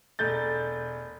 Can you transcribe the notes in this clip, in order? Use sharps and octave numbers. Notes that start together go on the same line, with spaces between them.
E1 A3 G6 A6